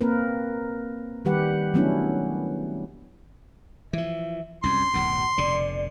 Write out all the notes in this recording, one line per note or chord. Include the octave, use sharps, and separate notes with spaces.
A#3 C4 A#4 B4
D#3 G3 G4 B4 F#5
F#3 A3 B3 C#4 D4 E4
E3 F3 E5
C2 F#2 C#4 C6
D1 B1 F#2 F#5
F1 B2 D3 D5